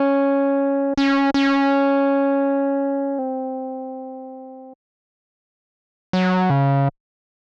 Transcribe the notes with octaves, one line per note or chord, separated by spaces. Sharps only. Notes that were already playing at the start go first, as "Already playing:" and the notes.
Already playing: C#4
C#4
C#4
C4
F#3
C#3